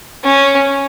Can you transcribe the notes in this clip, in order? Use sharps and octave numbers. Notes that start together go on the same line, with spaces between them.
C#4